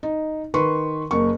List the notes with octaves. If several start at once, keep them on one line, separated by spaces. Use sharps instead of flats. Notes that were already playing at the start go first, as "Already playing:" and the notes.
D#4
D#3 B4 C6 C#6
F#1 A#3 C#6